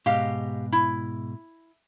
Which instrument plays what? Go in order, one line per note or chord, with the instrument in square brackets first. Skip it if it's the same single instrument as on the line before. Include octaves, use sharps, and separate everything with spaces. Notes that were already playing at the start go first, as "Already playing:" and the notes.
[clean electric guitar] G#2 B2 [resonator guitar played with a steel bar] G4 D#5 F5
[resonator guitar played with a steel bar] E4